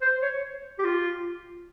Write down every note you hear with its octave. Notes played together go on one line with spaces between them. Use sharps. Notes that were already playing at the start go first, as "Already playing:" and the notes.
C5
C#5
G4
F4